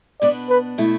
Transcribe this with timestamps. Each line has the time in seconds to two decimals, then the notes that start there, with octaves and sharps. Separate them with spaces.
0.21 B2 B3 D4 D5
0.50 B4
0.78 B2 A3 E4